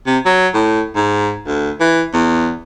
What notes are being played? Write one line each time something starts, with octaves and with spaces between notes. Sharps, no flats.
C3
F#3
A2
G#2
D2
E3
E2